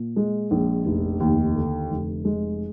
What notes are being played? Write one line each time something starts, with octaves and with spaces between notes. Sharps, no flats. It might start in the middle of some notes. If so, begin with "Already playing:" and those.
Already playing: A#2
G#3
A#1
F1
D#2
D3
F1
G#3